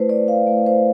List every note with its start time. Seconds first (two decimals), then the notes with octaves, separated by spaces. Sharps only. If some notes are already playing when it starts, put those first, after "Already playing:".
Already playing: A3 E4 B4 C5
0.09 D5
0.28 F5
0.47 A3 E4
0.66 C5